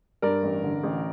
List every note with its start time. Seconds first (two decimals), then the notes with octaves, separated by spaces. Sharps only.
0.22 G2 A#4 D5
0.43 A1
0.64 D3
0.83 A1